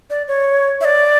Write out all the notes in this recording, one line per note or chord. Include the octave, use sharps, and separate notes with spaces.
D5
C#5
E5
D5